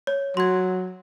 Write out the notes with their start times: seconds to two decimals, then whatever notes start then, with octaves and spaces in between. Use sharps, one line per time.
0.07 C#5
0.37 F#3 C6 G#6